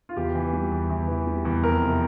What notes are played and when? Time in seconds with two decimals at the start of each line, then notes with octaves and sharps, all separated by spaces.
0.09 F4
0.16 E2 G4
0.35 E3
0.53 G3
0.71 E2
0.90 E2
1.08 E3
1.27 G3
1.45 E2
1.63 F2 A#4
1.82 C3